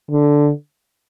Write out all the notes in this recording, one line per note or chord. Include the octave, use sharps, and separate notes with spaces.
D3